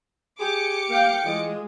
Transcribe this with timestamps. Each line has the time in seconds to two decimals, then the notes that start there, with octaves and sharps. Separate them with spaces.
0.40 G4 G#4 D6 C#7
0.90 A#3 F5 G5
1.25 E3 G#3 F4 D#5